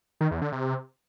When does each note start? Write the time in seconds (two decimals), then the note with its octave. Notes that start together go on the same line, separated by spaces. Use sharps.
0.21 D#3
0.31 E2
0.42 D3
0.52 C3